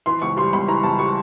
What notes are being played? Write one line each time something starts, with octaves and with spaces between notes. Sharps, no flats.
E3 C6
C#2 C#6
G3 C6
C#2 B5
E3 A#5
C#2 A5
G3 C#6